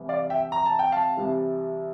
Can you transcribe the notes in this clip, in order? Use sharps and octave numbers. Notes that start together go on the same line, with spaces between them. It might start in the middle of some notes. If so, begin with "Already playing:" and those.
Already playing: C2 C3 E3 G3
D5 F5
E5 G5
A#5
A5
G5
F5 A5
C2 C3 E3 G3